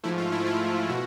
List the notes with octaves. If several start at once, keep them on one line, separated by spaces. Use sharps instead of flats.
G#2 F3 A3 E4
F4
E4
F4
B2 F#4